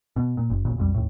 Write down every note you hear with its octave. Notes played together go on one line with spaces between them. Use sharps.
B2
A#2
F#1
E1 A#1 A#2 C#3
B1 F2 G3
D#2 A2